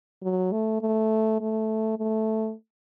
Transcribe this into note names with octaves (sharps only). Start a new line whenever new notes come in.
F#3
A3
A3
A3
A3